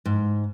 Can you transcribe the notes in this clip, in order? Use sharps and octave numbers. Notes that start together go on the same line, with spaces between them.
G#2